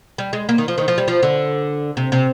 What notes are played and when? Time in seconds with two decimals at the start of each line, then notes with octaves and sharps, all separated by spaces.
0.18 G3
0.33 G#3
0.49 A#3
0.58 D#3
0.68 F3
0.78 D#3
0.88 F3
0.98 G3
1.08 F3
1.23 D3
1.97 C3
2.12 C3